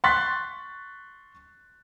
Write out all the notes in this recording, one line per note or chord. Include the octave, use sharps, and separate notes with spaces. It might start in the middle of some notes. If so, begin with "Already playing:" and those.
C6 C#6 F#6 A6 B6